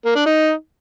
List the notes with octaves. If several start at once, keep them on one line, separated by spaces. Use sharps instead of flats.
A#3
D4
D#4